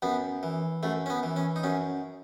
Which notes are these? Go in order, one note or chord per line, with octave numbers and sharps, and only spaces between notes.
F#2 B3
E3
F#2 A3
C#4
B3
E3
C#4
D#4
F#2 C#4